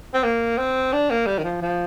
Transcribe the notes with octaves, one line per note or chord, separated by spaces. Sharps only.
C4
A#3
C4
D4
A#3
G3
D#3
F3
F3